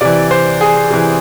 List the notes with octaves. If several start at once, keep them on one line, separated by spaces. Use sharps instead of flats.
C3 E3 D5
C5
G#4
C3 E3